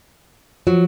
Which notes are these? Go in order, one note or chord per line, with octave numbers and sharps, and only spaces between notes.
F3 F#3